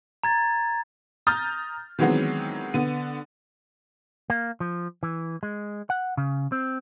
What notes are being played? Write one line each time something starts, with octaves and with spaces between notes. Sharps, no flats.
A#5 G#6 A6
A#5 D#6 F6 G6 A6
D#3 E3 F#3 G#3 B3 C4
D3 B3 D#7
A#3
F3
E3
G#3
F#5
C#3
C4